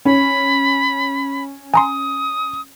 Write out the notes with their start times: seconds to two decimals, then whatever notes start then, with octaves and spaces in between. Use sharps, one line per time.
0.05 C#4 B5
1.74 G#5 A#5 C6 D#6